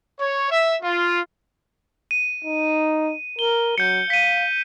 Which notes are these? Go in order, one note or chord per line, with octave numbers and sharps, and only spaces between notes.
C#5
E5
F4
D#7
D#4
A#4 G7
F#3 G6 C#7
F5 B6 D#7